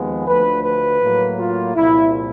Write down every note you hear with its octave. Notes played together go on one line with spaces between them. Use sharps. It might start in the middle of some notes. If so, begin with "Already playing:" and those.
Already playing: D#2 F3 G#3 B3
D2 D3 F3 A3 B4
B4
A2 F#3 A#3
F4
C2 A#2 F3 E4